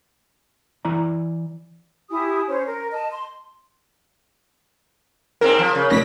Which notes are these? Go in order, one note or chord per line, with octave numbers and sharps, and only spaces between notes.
E3 E4 D5 A#5
E4 G4 G#5 D#6
C#4 C5
A#4
D#5 A5
C6
G#2 C4 A#4
F3
C#3
F1 A#2 A#6 B6